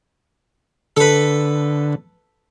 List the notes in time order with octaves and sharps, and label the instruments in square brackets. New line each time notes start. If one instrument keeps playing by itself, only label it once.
[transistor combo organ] D3 [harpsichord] A4 B4